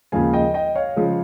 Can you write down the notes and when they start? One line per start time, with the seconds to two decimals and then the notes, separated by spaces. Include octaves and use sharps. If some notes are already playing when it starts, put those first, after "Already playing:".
0.12 D#2 C#3 F3 G#3 F5 G#5
0.33 D#5 G5
0.54 D#5 G5
0.75 C#5 F5
0.96 C#3 F3 G#3